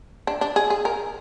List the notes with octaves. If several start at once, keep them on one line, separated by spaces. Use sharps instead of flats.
D4
D4
G#4
G#4
A#4